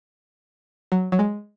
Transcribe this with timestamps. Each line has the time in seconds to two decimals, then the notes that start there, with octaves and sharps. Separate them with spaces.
0.92 F#3
1.12 F#3
1.19 G#3